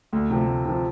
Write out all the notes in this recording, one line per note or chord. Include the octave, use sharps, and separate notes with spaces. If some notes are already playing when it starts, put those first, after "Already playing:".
D2
C3 F3
D2
C3 F3